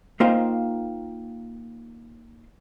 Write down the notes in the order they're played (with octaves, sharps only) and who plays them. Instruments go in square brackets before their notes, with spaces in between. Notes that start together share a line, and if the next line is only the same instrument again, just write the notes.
[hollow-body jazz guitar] A#3 D#4 F4 C5 F5 G5